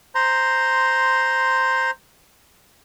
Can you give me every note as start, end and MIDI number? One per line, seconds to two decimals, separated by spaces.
0.15 1.91 72
0.15 1.91 82
0.15 1.91 84